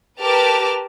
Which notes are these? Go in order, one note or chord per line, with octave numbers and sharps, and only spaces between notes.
G4 A#4 B4 A5 D6 F6